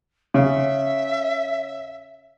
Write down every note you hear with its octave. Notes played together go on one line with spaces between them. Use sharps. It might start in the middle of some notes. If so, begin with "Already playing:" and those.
C#3 C#5 E5 F5